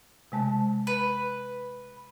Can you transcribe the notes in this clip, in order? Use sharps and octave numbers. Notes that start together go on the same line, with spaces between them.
C3 G#3 A5
B4